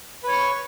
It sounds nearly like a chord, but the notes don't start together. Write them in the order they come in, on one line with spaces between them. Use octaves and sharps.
B4 C#5 C#6